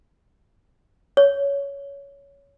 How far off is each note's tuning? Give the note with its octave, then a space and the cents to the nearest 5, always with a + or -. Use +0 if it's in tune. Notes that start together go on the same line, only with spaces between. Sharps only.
C#5 +15